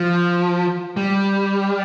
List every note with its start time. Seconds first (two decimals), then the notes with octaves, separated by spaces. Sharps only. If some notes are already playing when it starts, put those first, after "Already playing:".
Already playing: F3
0.97 G3